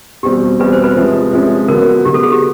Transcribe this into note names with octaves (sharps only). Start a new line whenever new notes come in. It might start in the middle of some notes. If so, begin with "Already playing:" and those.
E2 B2 G3 C4 G4
E2 B2 G3 C4 B4
C5
B4
C3 F3 G#3 C#4
C3 F3 G#3 C#4
D3 F#3 B3 A#4
D3 F#3 B3 G4
A4
G#4
G4